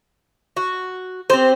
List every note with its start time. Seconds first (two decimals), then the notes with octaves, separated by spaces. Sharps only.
0.57 F#4
1.30 C4 G4 C5